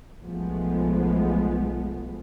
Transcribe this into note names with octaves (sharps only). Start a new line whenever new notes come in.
B1 F3 G#3 A3 B3